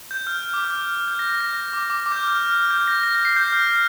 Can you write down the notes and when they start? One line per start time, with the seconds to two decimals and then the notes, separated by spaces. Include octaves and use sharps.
0.11 G6
0.27 F6
0.53 D6
0.64 F6
1.08 G6
1.19 A#6
1.29 A#6
1.41 A#6
1.73 D6
1.90 D6
2.06 D6
2.12 G6
2.16 F6
2.28 F6
2.38 F6
2.55 F6
2.71 G6
2.88 A#6
3.03 A#6
3.15 A#6
3.25 C7
3.37 G6
3.52 F6